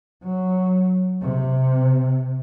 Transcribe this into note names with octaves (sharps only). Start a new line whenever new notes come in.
F#3
C3